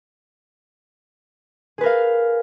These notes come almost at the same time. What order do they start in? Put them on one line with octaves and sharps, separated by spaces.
G#4 B4 A#4 F5